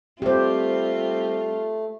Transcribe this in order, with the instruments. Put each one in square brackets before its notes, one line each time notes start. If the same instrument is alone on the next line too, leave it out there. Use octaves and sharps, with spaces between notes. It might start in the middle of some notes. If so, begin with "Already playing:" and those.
[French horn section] G3 C4 [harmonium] A3 [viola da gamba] F4 [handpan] G4 C5